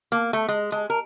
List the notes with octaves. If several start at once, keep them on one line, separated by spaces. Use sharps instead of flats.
A#3
A3
G#3
G#3
A#4